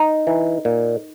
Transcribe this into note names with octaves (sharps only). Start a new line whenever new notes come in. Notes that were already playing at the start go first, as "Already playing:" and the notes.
Already playing: D#4
E3
A#2